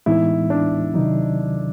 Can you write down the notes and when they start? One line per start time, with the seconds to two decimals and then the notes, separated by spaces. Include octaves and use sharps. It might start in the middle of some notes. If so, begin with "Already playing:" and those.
0.06 A2 E3 G#3 B3 D#4 E4
0.50 D4
0.94 C3 D#3 F#3 D#4